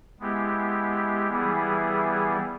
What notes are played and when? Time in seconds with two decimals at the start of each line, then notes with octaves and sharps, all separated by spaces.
0.20 G#3 B3 E4 G4
1.28 E3 G3 B3 E4 G#4